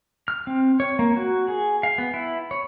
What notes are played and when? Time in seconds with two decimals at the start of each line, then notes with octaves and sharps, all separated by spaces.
0.28 F6
0.47 C4
0.80 C#5
0.99 A#3
1.16 F#4
1.48 G#4
1.83 F5
1.98 B3
2.14 E4
2.51 C#5